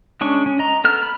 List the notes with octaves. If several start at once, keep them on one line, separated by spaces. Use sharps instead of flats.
G#3 C#4 D4 C#6
C#4
D#5 A#5
B3 A4 F6
B5